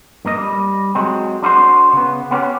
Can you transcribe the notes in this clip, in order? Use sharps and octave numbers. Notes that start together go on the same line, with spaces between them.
G2 A#3 D#5
G3
F#3 G#3 C4
D4 E4 F#4 C5
C#3 B3
B3 C#4 G4